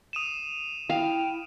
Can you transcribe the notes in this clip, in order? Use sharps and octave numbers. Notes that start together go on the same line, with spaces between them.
D#6 D#7 E7
E4 F5 G5